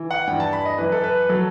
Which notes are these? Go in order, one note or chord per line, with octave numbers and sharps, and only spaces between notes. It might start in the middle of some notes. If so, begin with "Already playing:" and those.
Already playing: E3
F#5
G2 E3 G5
A5
B5
D#5
F#2 E3 B4
A4
B4
F#3 A4